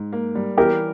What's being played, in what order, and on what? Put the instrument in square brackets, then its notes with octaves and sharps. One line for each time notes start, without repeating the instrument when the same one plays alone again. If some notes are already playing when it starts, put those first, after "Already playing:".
Already playing: [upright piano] G#2
A#3
G3
[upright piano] E3 [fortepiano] G4 A#4